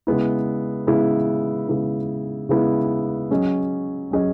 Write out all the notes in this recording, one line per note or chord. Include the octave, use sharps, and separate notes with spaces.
C#3 G#3 B3 E4
C#3 G#3 B3 E4
C#3 G#3 B3 E4
C#3 G#3 B3 E4
F#3 C#4 G#4 D#5
F#3 C#4 G#4 D#5